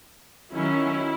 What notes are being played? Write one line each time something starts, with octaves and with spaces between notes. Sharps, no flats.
D#3 F#3 C#4 E4